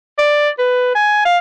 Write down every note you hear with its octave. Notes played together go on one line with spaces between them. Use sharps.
D5
B4
G#5
F5